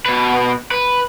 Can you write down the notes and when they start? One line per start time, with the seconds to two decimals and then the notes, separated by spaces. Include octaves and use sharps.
0.06 B2 B4
0.71 B4